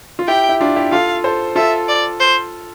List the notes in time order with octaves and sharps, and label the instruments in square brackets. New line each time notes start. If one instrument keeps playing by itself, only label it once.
[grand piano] F4
[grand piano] E4 G4 [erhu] G5
[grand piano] E4
D4 F4
E4 G4
[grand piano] F4 A4 [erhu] F5
[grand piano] A4 C5
[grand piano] F4 A4 [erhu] E5
[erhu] D5
C5